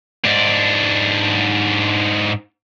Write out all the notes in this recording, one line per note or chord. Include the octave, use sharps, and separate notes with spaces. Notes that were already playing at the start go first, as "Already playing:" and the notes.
G#2 D4